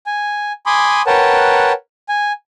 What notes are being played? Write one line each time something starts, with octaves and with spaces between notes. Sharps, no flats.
G#5
G#5 B5 C6 D6 D#6
A#4 B4 C#5 F#5 G5 A5
G#5